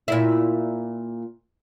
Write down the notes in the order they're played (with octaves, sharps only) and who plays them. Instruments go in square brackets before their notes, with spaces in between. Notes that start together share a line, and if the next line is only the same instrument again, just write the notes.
[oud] A#2 E4